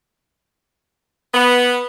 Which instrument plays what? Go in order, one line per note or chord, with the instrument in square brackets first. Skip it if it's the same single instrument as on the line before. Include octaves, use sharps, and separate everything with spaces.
[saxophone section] B3